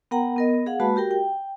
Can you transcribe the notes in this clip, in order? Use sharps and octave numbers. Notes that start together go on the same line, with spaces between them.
B3 A#4 F#5 G5 A#5
B3 A#4 D#5
G#4 F5 F#5
G#3 A#3 F#4 B4 A5 B5
F#4 G4 A#4 G5
G5